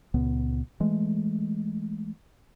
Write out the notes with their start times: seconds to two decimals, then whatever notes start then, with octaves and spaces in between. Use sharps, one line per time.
0.14 C#2 A#2 B3
0.80 E3 G#3 A3